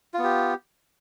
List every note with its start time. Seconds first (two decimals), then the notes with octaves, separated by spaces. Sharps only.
0.14 F4
0.19 B3
0.24 G4